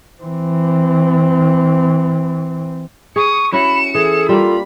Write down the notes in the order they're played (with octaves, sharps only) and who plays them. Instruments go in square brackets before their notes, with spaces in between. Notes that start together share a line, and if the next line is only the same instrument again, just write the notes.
[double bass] E3 C4
[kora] G#4 [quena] C#6 [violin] D#6 C#7
[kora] C#4 E4 F#4 [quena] B5 [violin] C#7 E7
[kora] E3 [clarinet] G#4 [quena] A4
[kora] G3 A#3 [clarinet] F4 [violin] B5